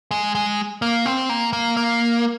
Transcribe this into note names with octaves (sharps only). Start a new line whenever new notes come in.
G#3
G#3
A#3
C4
A#3
A#3
A#3